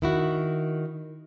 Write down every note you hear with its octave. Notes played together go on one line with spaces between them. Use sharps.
D#3 E4 F#4